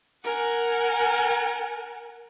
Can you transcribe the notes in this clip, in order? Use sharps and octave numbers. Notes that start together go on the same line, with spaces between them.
A#4 F#5 G#5